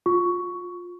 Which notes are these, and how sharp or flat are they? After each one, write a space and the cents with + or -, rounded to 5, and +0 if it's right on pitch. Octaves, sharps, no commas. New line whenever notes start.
F4 +25 C#6 +10